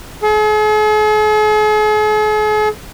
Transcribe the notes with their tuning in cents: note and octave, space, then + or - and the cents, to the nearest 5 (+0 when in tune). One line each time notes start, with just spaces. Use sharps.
G#4 +45